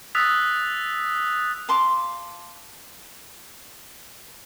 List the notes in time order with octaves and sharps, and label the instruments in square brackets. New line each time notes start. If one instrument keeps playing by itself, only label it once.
[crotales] D#6 E6 F#6 A6 B6 F7
[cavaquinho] F5 A5 C6 D6